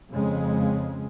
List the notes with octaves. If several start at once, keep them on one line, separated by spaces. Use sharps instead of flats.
F2 C#3 G#3